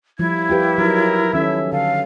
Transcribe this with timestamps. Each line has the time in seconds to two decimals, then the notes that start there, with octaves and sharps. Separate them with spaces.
0.19 F3 G3 E4 G#6
0.50 F4 G4 B4 G5
0.78 F#3 D#4 A#4
1.33 D#3 C#4 A4 E5
1.72 D3 A4 F5